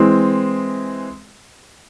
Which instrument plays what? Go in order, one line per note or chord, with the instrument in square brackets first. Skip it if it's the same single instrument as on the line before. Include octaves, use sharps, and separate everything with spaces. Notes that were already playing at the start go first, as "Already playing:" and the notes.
Already playing: [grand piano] E3 G#3 C4